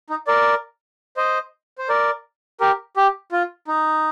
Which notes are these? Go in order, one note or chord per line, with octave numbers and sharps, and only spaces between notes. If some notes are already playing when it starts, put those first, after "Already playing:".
D#4
A#4 D5
C5 D#5
C5
A#4 D5
G4 A#4
G4
F4
D#4